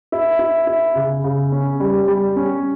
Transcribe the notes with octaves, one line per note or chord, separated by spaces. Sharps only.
E4
E4
E4
C#3
C#3
C#4
G3
G3
C#4